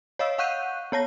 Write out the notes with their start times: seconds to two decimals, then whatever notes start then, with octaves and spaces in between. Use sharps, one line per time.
0.19 C#5 D#5 F5 E6
0.38 F5 F#5 C#6 F#6 G6 D#7
0.92 B3 C#5 A5 A#6